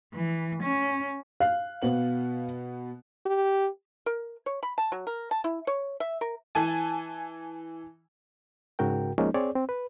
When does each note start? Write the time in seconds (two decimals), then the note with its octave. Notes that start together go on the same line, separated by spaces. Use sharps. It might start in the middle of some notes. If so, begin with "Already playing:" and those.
0.15 E3
0.63 C#4
1.40 F5 F#6
1.82 B2 B3 F#7
3.26 G4
4.06 A#4
4.46 C#5
4.63 B5
4.78 A5
4.92 F#3
5.07 A#4
5.31 A5
5.44 E4
5.67 C#5
6.00 E5
6.21 A#4
6.55 E3 G#5 A5
8.79 G#2 C#3 F#4 A#4 G5
9.18 F3 G#3 A#3 C#4 D#4
9.34 C4 G#4 C#5 D5
9.55 C4
9.69 B4